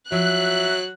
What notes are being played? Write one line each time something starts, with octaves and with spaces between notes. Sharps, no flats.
F3 F#3 E5 F#6